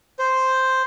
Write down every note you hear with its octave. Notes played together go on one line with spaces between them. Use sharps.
C5